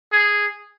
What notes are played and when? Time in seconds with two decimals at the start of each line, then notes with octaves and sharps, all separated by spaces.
0.13 G#4